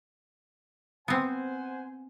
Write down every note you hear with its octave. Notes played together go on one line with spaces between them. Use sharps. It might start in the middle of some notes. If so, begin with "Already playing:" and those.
B3 C4 C5 F#5 G#5